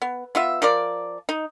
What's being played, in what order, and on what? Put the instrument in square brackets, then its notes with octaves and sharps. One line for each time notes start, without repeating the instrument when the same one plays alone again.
[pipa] B3
B3 F4 E5
F3 A#4 D5
D#4